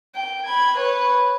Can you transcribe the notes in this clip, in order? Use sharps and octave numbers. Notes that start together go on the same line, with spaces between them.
G5
B5 G#6
B4 C#5